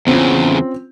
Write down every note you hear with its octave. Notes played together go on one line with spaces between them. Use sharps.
E2 C#3 C4 C#4 F4